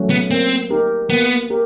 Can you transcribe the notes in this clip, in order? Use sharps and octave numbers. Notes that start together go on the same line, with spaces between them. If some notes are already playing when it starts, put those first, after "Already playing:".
Already playing: F#3 A3 C#4 F#4
B3
A#3 C4
D#4 G4 A#4
A#3 B3
G4 A#4